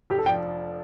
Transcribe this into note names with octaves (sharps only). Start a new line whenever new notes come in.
F1 G4
A4
F3 D4 G5